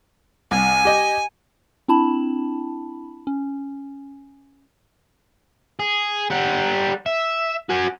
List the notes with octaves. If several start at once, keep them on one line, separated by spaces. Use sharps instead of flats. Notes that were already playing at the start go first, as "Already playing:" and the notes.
C2 G#5
G4 D#5
C4 D4 E4 A5 B5
C#4
G#4
G3 F#5
E5
F#4 G#5